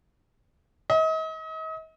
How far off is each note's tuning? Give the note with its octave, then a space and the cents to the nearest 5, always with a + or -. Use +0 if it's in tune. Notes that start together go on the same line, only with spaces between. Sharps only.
D#5 +40